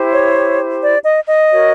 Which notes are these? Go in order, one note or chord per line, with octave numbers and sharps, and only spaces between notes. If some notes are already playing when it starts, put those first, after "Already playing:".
Already playing: E4 G4 C5
C#5
D5
D#5
D#5
F#4 A#4 C#5